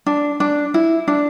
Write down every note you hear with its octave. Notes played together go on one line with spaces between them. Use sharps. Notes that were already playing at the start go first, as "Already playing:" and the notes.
D4
D4
E4
D4